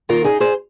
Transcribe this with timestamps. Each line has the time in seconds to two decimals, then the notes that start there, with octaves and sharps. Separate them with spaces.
0.09 D#2 D#3 F4 A#4
0.24 D#4 G#4
0.40 G#4 C5